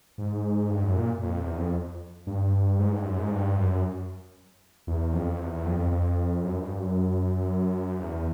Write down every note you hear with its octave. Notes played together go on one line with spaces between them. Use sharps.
G#2
G2
F#2
A#2
F2
E2
F2
G2
G#2
G2
F#2
G#2
G2
F#2
E2
F2
E2
E2
F2
F2
F2
F#2
G2
F#2
E2